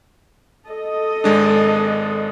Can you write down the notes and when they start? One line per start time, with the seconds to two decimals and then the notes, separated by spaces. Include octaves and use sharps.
0.68 A4 D#5
1.24 G#1 G#3 D4